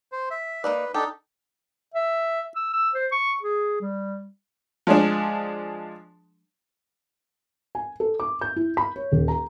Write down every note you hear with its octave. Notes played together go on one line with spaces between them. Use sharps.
C5
E5
A#3 D#4 B4 D5
D4 D#4 G4 A4
E5
E6
E6
C5
C#6
G#4
G3
F3 G#3 D4
G#5
A4
D6
G6
E4
B5
C#5
D#1
A#5